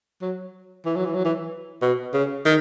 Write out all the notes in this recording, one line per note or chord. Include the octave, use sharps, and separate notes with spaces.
F#3
E3
F#3
E3
F#3
E3
B2
C#3
D#3